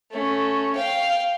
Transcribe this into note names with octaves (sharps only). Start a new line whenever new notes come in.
A3 C#4
F5 G5